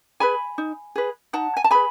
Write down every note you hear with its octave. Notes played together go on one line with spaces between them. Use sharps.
G#4 B4 G#5 B5
D#4
G#4 B4
D#4 F#5 A5
G#5
A5
G#4 B4 G#5 B5